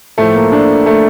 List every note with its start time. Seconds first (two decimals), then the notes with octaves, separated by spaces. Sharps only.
0.18 A2 F3 A3
0.34 A#3
0.52 D4
0.86 A3